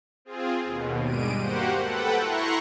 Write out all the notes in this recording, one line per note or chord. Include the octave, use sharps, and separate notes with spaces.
C4 F4 G#4
D#2 B2
G2 G3 G#3 D7 D#7
A#3 F#4 G4 C5 F#5
A4 B4 F#5 G5
E4 A#5 C6 C#6 F#6